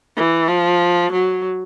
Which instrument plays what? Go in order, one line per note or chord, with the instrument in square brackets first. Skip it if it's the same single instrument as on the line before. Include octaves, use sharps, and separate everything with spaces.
[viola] E3
F3
F#3